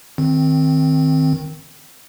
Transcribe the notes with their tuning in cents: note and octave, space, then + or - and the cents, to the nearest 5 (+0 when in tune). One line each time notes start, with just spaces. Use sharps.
D#3 +0 C4 +0